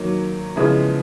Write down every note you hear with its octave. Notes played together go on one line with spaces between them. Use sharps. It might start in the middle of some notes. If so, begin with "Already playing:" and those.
Already playing: D#3 F#3 A#3
C#3 F3 G#3 B3 E4